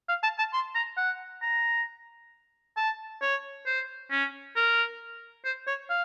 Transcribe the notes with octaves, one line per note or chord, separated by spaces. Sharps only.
F5
A5
A5
C6
A#5
F#5
A#5
A5
C#5
C5
C#4
A#4
C5
C#5
F5